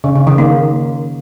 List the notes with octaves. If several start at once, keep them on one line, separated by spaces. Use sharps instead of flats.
C#3
C#3
D#3
A#3